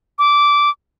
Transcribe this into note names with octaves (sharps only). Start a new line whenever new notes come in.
D6